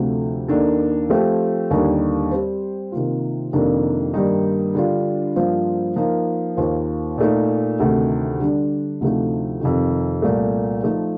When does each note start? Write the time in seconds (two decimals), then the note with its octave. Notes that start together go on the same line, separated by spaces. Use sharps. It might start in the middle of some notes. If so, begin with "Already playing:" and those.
Already playing: D2 C3 F3 A3
0.48 D#2 D#3 A#3 D4 A4
1.10 F3 A3 C4 G4
1.71 D#2 D3 G3 A#3 D#4
2.32 G3 C4 G4 C5
2.92 C3 D#3 A#3 F4
3.53 F2 C3 D#3 A#3 D4
4.14 G2 D#3 G3 A#3 D#4
4.75 D3 G3 D4 F4
5.36 G2 F3 A#3 F4 C5
5.96 F3 A#3 D#4 A#4
6.57 D#2 D#3 A#3 F4 C5
7.18 A#2 A3 D#4
7.79 D2 C3 D#3 A3 D#4
8.40 D3 G3 D4
9.01 D2 C3 F3 A3 D#4
9.61 F2 C3 D#3
10.22 C2 A#2 A3
10.83 F3 A3 D#4